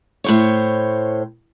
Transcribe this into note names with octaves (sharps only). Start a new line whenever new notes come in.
A2 C5 C#5